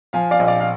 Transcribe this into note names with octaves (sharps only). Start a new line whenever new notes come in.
F3 F5 G#5
D5 F5
A#1 D#5
D5 F5
F5